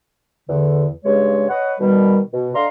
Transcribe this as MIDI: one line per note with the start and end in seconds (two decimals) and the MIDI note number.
0.49 0.87 40
0.49 0.87 50
1.05 1.45 43
1.05 1.45 49
1.05 1.45 56
1.05 1.45 73
1.49 1.74 71
1.49 1.74 73
1.49 1.74 75
1.49 1.74 78
1.80 2.19 47
1.80 2.19 51
1.80 2.19 55
2.33 2.50 47
2.55 2.66 50
2.55 2.66 74
2.55 2.66 75
2.55 2.66 77
2.55 2.66 82
2.55 2.66 84